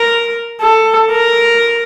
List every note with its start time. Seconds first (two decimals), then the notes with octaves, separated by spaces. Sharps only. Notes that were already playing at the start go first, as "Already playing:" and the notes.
Already playing: A#4
0.61 A4
1.11 A#4